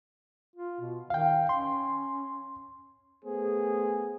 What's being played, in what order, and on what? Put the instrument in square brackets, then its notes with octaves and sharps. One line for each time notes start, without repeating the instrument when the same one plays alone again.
[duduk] F4
B2
[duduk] D#3 [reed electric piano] F5 G5
[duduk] C#4 [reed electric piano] C6
[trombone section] A3 B3 G#4 C5